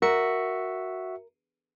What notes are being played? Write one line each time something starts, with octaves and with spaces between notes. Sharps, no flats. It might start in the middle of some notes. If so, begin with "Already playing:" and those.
F#4 A#4 E5 C#7